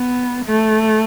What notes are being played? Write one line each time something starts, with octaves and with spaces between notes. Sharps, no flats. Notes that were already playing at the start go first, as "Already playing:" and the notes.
Already playing: B3
A3